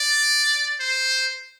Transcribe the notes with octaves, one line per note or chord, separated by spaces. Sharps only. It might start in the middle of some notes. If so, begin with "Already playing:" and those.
Already playing: D5
C5